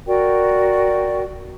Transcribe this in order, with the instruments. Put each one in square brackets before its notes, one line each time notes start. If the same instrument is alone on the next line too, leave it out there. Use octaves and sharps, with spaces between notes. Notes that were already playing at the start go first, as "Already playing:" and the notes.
[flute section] F#4 A#4 D5 G5